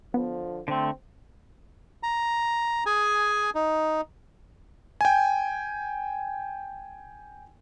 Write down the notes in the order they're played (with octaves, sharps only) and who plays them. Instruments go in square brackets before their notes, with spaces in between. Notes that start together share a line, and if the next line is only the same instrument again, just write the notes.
[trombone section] D3 F3 [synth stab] B3
[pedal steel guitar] D3 A3 [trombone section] C4
[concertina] A#5
G#4 G#5
D#4
[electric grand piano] G5 G#5